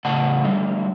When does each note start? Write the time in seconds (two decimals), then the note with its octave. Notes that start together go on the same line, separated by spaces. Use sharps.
0.05 A2 C#3 D#5 F#5 A5
0.44 D3 F#3 G3 A3